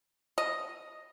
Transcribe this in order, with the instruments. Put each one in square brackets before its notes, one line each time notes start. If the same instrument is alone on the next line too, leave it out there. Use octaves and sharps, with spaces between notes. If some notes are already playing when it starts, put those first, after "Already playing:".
[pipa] D#5